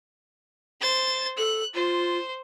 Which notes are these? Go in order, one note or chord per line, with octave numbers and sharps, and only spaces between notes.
C5 A6
A4 F#6
F4 C5